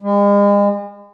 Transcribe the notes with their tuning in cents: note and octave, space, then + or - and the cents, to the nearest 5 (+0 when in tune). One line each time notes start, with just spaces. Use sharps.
G#3 -40